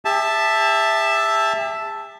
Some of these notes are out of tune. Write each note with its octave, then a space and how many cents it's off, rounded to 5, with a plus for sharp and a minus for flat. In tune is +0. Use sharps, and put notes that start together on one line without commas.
G4 +45 E5 +0 A5 +0